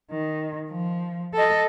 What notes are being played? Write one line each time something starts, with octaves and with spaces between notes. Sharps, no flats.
D#3
F3
A4 D#5